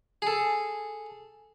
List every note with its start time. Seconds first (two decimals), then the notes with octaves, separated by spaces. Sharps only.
0.22 G#4 A4